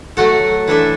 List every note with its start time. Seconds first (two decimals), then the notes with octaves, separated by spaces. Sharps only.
0.17 F#3 A3 F#4 A4
0.68 E3 D4 A4 E5